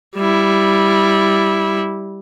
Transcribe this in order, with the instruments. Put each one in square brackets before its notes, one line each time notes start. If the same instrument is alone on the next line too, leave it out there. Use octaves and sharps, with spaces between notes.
[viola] G3 E4